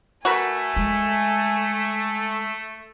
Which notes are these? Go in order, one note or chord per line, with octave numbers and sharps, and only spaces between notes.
A3 F#4 A#4 B4 G#5
G#3